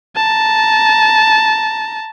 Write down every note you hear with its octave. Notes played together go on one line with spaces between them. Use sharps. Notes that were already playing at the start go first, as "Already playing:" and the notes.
A5 A#5